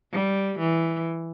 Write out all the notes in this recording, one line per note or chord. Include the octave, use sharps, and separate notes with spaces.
G3
E3